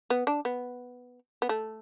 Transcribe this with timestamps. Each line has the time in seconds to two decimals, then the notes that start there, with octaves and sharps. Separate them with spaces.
0.10 B3
0.27 D4
0.45 B3
1.42 B3
1.49 A3